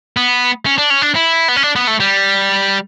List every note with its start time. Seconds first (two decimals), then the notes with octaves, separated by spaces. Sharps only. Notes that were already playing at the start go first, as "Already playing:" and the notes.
0.17 B3
0.66 C#4
0.78 D4
0.90 C#4
1.02 D4
1.15 E4
1.48 B3
1.56 C#4
1.63 D4
1.76 B3
1.87 A3
2.00 G3